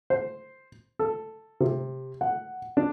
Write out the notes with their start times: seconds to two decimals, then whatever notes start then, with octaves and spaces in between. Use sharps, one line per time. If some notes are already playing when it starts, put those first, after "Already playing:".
0.10 C5
0.99 A4
1.61 C3
2.21 F#5
2.77 D4